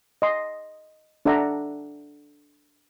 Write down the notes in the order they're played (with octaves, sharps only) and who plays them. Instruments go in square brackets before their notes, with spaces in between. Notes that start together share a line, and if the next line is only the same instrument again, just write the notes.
[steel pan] D#5 C6
D4 A4 D5 E5 F#5 A#5